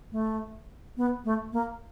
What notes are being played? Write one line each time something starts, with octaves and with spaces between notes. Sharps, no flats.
A3
B3
A3
A#3